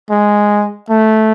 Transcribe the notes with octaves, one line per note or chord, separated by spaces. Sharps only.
G#3
A3